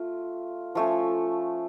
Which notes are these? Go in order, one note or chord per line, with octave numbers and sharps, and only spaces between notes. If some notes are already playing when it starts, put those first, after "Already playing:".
Already playing: A3 F4
F3 A3 C#4